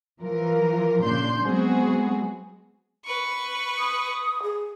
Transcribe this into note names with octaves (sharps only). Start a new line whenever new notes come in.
E3 F3 F4 A#4
A#2 C#3 D4 C6 G6
F#3 G#3 B3 C4 F#4 G#4
B4 C#6
D#6
G#4